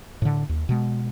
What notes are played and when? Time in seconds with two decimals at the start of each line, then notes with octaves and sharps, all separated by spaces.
0.22 A2 D3
0.49 D#2
0.69 B2 G#3